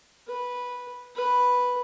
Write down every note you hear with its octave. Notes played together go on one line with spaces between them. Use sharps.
B4
B4